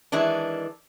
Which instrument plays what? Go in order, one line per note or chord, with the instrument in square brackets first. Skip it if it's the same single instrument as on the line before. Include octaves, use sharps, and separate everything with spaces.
[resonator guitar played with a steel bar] D#3 E3 G#3 D4